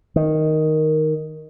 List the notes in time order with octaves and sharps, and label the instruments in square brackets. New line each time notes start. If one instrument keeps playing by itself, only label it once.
[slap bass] D#3